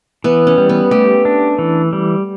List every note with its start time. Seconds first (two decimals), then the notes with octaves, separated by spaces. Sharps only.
0.24 E3 B3
0.47 C#4
0.58 G3
0.69 B3
0.91 A3 G4
1.25 D4
1.59 E3
1.93 G3